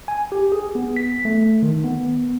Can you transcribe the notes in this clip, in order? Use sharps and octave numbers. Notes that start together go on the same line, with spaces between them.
G#5
G4
G#4
B3
B6
A3
D#3
B3